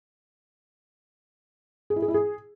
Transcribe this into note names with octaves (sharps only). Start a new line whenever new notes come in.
G#4
E4
G#4
E4
G#4